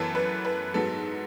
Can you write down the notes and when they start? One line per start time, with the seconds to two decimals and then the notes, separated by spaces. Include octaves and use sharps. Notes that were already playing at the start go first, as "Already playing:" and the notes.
Already playing: F#2 E3 B3 A4
0.15 B4
0.45 B4
0.74 G#2 F#3 B3 A4